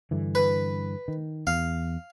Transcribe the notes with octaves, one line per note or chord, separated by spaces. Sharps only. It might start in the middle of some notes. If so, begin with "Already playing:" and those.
G2 D3 E3
B4
D#3
E2 F5